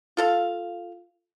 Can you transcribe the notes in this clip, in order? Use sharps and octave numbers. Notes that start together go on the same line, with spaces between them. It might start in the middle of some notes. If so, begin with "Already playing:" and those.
F4 A4 F5